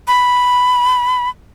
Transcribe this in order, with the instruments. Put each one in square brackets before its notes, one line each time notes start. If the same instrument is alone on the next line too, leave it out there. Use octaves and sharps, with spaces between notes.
[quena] B5